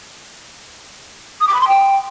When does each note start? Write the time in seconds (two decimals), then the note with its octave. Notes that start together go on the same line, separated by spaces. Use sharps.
1.40 D#6
1.47 D6
1.54 B5
1.61 C6
1.68 G5